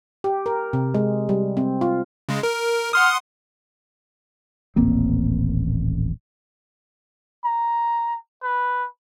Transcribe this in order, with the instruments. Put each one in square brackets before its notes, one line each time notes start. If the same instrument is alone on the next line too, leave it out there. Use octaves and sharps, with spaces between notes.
[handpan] G4
A#4
C3
G#3
G3
C4
F4
[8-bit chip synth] C#3 G#3
A#4
[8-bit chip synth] F#5 C6 D#6 [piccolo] F6
[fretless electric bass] D#1 A1 A#3 C4
[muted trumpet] A#5
B4